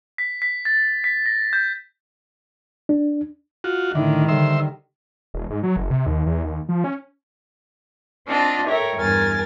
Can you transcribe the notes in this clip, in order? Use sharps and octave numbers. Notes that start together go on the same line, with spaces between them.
B6
B6
A6
B6
A#6
G6
D4
F4 F#4
A2 D3 D#3 E4
D3 G3 C5 E5
E1
G#2
F#3
F#1
C3
D#2
E2
D#2
F3
C#4
C4 D4 F4 D#5
A4 A#4 C#5 E5 G5
E2 G2 A#4 G#5 A6